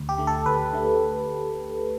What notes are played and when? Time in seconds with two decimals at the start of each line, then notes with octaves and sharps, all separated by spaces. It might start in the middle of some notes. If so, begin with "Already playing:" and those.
Already playing: D2
0.09 G4
0.18 D3 A3
0.27 A4
0.46 D2 B4
0.73 D3 A3